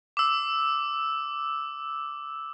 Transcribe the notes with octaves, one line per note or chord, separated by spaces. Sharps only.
D6 E6